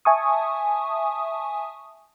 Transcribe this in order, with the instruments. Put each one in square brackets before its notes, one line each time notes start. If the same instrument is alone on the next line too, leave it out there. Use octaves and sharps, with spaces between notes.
[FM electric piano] E5 G#5 A5 C#6 D#6